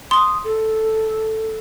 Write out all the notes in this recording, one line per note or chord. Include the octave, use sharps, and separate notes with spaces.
C6 D#6
A4